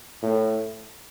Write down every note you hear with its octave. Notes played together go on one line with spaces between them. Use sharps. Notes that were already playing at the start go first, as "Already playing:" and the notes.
A2